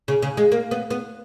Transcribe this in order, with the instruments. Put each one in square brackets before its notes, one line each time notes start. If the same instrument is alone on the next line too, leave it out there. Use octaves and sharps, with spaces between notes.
[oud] C#3
C#3
G#3
A#3
B3
B3